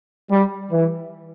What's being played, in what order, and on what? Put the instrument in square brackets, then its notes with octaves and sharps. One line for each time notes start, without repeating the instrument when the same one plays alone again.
[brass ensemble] G3
E3